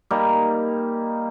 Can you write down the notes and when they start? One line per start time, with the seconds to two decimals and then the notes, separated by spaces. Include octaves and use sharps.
0.11 G3 A#3 D#4